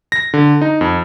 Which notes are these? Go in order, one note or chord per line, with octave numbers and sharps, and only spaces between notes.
A#6
D3
D#4
F2